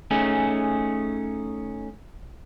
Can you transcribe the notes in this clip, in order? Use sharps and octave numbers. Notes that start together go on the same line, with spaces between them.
A3 C#4 D#4 G#4